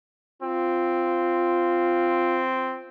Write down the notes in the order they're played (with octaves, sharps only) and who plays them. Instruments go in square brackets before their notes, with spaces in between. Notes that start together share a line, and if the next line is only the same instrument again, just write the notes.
[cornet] C4 [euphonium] F4